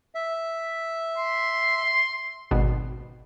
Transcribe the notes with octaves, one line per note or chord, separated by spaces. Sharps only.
E5
C6
G#1 B2